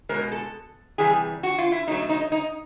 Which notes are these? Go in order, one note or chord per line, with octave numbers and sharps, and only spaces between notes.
B2 G#3 A#4
A4
C3 E3 G3 G#4
F#4
F4
E4
B2 F#3 A3 D#4
D#4
D#4